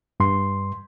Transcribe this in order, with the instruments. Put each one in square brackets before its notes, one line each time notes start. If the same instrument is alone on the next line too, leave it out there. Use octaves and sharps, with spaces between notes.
[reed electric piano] G2 C6